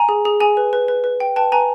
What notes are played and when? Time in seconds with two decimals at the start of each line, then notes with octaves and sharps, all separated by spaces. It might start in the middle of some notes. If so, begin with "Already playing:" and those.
Already playing: G#5 A#5
0.09 G#4
0.25 G#4
0.41 G#4 G#5
0.57 B4
0.73 B4
0.88 B4
1.04 B4
1.20 G5
1.36 B4 G5 A5
1.52 B4 G#5 A#5